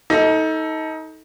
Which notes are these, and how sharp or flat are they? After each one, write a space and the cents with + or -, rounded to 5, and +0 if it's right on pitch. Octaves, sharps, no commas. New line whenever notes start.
D#4 +25 A4 +0